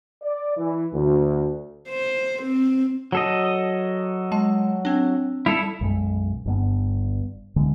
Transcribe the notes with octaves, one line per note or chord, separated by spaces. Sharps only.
D5
E3
D2
C5
C4
F#3 A4 D#5
G#3 A5
C4 D4
G3 E4 A4 F7
B1 F#2 G#3
G1 G2 B3
D2 D3 E3 G#3